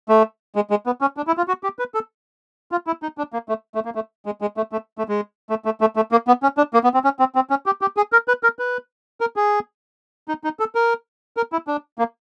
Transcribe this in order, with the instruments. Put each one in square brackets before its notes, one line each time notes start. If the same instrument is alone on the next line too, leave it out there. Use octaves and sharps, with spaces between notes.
[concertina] A3
G#3
G#3
B3
C#4
D4
E4
F4
F#4
G4
B4
A4
F4
E4
D#4
D4
A#3
A3
A3
A#3
A3
G#3
G#3
A3
A3
A3
G#3
A3
A3
A3
A3
A#3
B3
C#4
D4
A#3
B3
C4
C#4
C4
C4
C#4
G4
G4
G#4
A#4
B4
A#4
B4
A#4
G#4
D#4
D#4
A4
A#4
A#4
E4
D4
A#3